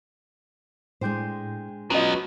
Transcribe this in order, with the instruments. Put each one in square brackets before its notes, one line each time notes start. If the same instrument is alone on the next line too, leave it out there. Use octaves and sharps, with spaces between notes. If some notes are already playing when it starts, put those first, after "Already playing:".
[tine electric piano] A2 G5 G6 [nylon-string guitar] G#3 D4 C5
[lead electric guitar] F#3 B3 [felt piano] C#4 F#4 D#5 [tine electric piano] F4 B4